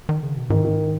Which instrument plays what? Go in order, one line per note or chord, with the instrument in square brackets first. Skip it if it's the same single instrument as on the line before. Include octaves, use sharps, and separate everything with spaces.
[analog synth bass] D#3
C#3
B2
[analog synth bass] G#2 [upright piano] D#3
[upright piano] D#3